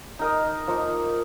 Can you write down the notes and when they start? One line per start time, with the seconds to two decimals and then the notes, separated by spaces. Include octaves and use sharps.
0.19 D#4 A#4 D#5
0.68 F3 A#3 D#4